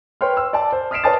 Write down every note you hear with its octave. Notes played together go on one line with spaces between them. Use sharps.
B4 C#5 G5 C6 F6
E6
D5 A5
C5
D#6 F6 B6 C7 D7 E7
B4 C#5 D5 A5 D#6 A6